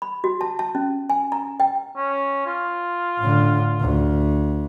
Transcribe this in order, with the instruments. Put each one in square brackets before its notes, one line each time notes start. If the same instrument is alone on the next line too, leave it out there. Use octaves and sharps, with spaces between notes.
[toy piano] B5
F#4
A5
A5
C#4
G#5
A#5
G5
[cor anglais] C#4
F4
[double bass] A2 D3
D2